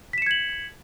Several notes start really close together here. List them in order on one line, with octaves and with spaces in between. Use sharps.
B6 E7 C#7 G#6 F#7